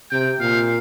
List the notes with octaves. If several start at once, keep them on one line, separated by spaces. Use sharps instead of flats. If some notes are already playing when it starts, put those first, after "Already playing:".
C3 G5
A#2 F5